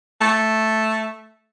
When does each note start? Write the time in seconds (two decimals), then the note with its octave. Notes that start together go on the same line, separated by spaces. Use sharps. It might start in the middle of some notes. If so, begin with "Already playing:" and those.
0.21 A3